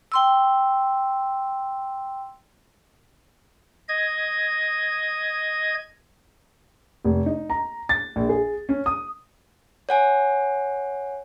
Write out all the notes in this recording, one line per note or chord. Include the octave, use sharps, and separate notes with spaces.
G5 C6 E6
D#5 G#6
F1
D#4
A#5
A6
A#1
G#4
C#4
D#6
C#5 F#5 G#5